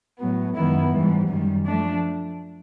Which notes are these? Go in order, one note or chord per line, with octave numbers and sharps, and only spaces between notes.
A2 F#3 B3
F#2 D#3 G#3 B3 E4
G#2 E3 G3
F#2 D#3 G3
F3 A3 D4